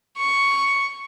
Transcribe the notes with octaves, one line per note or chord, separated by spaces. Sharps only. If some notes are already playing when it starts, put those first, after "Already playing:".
C#6